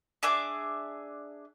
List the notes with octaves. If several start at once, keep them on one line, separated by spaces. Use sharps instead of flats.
D4 G#4 E5 D6